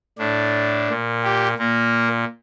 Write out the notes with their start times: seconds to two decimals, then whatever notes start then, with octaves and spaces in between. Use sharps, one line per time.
0.18 A2 D4
0.89 A#2
1.24 G4
1.58 A#2 A#3